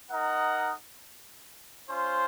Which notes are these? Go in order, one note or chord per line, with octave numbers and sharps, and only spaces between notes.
D#4 A#4 D#5 F#5
C#4 F4 C5